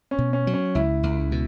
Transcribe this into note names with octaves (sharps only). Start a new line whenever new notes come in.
C#4
B2
C#4
F#3
C#4
C#2 E4
C#2
B2